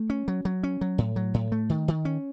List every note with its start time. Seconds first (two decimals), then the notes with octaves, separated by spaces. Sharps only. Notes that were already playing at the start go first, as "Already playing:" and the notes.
Already playing: A3
0.10 C#4
0.28 F#3
0.45 F#3
0.63 C#4
0.81 F#3
0.98 A2
1.16 F#3
1.34 A2
1.52 A3
1.70 D#3
1.88 D#3
2.05 C#4